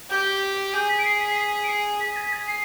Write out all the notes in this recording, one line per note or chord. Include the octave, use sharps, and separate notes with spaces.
G4 G6
G#4 G6
B6
D7
C7
B6
C7
B6
D7
C7
G#4 B6
B6
G#6
B6
G#6
C7